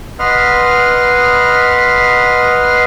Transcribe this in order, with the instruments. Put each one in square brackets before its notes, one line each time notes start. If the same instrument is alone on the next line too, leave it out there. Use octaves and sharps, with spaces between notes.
[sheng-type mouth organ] B4 D#5 F#5 C6 F6